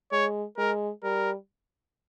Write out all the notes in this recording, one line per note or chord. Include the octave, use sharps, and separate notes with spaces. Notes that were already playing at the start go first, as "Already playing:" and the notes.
G#3 C#5
G#3 A#4
G3 A#4